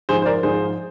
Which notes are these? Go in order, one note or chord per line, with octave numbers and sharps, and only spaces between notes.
G#2 F3 G#4 C5
C5
A#4 D5
G#2 F3 G#4 C5